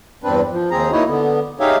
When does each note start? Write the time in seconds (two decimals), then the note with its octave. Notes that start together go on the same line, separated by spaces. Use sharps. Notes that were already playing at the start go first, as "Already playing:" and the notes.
0.24 E2 G2 C4 D4 B4
0.51 F3
0.71 D#2 C4 G#4 A#5
0.92 A#3 D#4 E4 F#4 C#5 D#5
1.07 D3 B3
1.60 D#4 G4 G#4 C#5 E5 F5